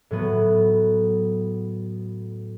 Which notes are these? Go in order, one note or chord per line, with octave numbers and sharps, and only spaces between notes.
A2 F#3 B3